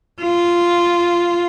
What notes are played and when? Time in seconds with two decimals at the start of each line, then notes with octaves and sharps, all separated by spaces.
0.22 F4